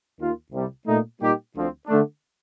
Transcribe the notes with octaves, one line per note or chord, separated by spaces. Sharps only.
D#2 D#3 A#3 F4
C2 C3 G3
A#2 A3 D#4
A#2 G3 A#3 D#4 G4
D2 D3 F3 C4
D3 A3 D4